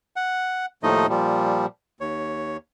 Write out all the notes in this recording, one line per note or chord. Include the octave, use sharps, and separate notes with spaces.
F#5
D#2 A2 F3 A3 D#4 D#5
A#2 F3 G3
D#2 C#5